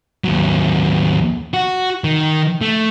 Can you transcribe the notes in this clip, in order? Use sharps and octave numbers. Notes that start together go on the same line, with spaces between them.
D#2 F#3
F#4
D#3
A3